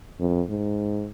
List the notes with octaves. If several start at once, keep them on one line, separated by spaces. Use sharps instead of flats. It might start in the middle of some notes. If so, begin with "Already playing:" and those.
F2
G#2